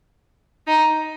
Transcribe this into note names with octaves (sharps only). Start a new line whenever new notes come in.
D#4